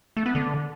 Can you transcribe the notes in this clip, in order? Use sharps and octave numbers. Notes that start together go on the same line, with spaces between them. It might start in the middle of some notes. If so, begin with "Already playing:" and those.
A3
B3
D3